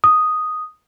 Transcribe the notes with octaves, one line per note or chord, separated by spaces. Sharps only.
D#6